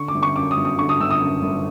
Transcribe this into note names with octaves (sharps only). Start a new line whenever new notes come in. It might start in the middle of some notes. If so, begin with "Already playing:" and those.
Already playing: D3 C#6
D6
G1
C#6
F#2 D6
D#6
G1
D#6
D3 C#6
D#6
G1 E6
D#6
F#2
G1